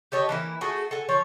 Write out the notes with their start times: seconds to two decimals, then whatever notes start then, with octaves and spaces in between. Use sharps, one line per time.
0.12 G4 A4 C#5 D#5
0.29 E3 A#3 E4
0.61 A3 F#4 G#4 A4
0.91 A4 F#5 G#5
1.09 F3 A4 C#5